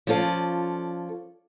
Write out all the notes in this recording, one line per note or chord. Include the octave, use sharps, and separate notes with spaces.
F3 C#4 F4 A4 D5